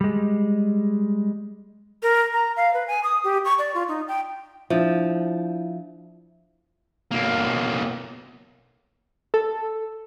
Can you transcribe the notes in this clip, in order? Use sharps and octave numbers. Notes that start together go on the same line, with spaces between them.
G3 G#3
A#4
A#5
F5
B4
G#5
D#6
G4
C#6
D5
F4
D#4
G5
F3 D4 E4 E5
B1 A#3
A4